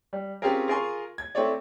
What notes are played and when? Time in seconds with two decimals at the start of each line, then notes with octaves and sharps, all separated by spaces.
0.13 G3
0.42 C4 C#4 F4 G4 G#4 A#4
0.68 F4 G#4 A#4 G#5 C6 C#6
1.18 G#6
1.35 A3 C4 E4 C#5 D5